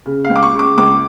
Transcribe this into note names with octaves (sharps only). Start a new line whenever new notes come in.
C#3
C#2 F5
D6
C#6
C#3
D6
C#2 D6